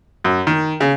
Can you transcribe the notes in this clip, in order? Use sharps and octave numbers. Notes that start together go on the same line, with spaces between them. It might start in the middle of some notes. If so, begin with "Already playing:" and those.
F#2
D#3
C#3